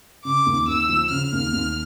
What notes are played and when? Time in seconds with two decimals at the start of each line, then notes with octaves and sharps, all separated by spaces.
0.25 C#3 D6
0.46 D#2
0.68 D#2 E6
0.89 F3
1.11 C#3 F6
1.33 D#2
1.53 D#2